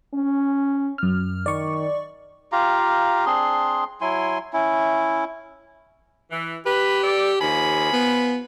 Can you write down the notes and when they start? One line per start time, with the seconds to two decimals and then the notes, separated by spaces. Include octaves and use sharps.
0.14 C#4
0.98 F#2 F6
1.46 D#3 D5 C#6
2.52 F4 G4 F5 A#5
3.26 C4 D4 G#4 C6
4.01 F#3 E4 G#5 C6
4.53 C#4 E4
6.32 E3
6.66 G4 B4
7.03 A4 D5
7.41 D#2 F3 G#5 B5
7.92 B3